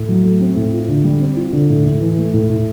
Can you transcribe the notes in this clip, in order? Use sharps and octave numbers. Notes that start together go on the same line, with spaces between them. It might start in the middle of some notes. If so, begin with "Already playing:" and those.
Already playing: A2
F#3
A3
C4
A2
F4
D3
G3
C4
F4
D3
A2
A2
E3
A3
A2
A2